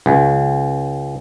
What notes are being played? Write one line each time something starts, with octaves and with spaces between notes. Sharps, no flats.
C#2